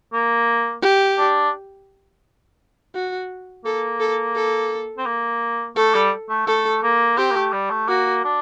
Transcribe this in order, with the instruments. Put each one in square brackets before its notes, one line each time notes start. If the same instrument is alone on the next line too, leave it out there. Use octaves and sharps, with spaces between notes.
[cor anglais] A#3
[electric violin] G4
[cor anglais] D4
[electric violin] F#4
[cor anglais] A#3 [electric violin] A4
[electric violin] A4
A4
[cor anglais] C4
A#3
[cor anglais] A3 [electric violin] A4
[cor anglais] G3
A3
[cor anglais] A3 [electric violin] A4
[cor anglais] A#3
[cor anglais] C4 [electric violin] G4
[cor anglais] A#3
A3
G3
A3
[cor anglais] A#3 [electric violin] F#4
[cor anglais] D4